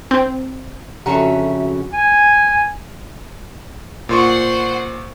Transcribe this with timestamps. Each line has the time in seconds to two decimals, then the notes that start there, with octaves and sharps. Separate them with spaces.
0.11 C4
1.06 F2 C#3 C#4 F#4 G4 E5 F#5 A#5
1.93 G#5
4.09 A#2 C5 F#5 C6 C#6